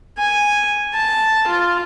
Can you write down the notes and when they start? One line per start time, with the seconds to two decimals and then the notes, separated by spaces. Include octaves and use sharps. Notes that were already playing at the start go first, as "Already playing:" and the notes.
0.18 G#5
0.94 A5
1.47 F4